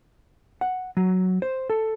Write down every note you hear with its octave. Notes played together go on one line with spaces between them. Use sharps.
F#5
F#3
C5
A4